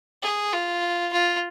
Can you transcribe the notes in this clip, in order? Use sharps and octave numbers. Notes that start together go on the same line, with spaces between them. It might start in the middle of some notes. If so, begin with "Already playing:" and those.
G#4
F4
F4